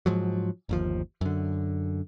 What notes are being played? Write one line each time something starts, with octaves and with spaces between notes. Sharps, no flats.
G#2 F3 F#3
G1 D#2 F3
F#2 D3